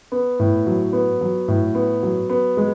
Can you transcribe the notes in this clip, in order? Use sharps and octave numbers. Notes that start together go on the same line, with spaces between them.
B3
A2
F#3
B3
F#3
A2
B3
F#3
B3
G#3